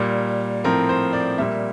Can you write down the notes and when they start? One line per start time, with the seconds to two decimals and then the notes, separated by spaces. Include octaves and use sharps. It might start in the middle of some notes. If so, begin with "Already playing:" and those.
Already playing: A#2 G3 A#3
0.64 A2 F3 C4 A#4
0.89 C5
1.13 D5
1.38 A#2 G3 A#3 E5